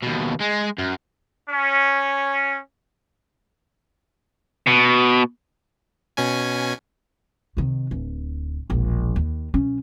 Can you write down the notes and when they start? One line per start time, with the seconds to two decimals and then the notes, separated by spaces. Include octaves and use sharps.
0.02 D#2 B2
0.40 G#3
0.78 F#2
1.48 C#4
4.67 B2
6.17 B2 C#4 G#5
7.57 C3 D#3
7.91 D1
8.70 E1 A#1
9.16 D#2
9.54 B1 C#4